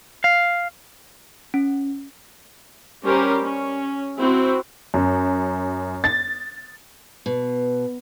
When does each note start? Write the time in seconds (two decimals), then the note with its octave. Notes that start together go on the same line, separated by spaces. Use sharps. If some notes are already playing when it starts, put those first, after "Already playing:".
0.24 F5
1.54 C#4
3.06 G3 C#4 G4 A#4 C5
3.43 C#4
4.20 C4 E4 F#4
4.94 F#2
6.04 A6
7.26 B2